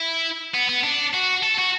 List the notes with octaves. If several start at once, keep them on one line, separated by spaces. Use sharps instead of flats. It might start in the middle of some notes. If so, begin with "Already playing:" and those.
Already playing: E4
B3
B3
D4
F#4
A4
F#4